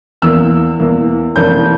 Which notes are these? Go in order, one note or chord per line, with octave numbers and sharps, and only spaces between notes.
E2 E3 A#3 E6
E2 E3 A#3
F1 F2 E3 A#3 G6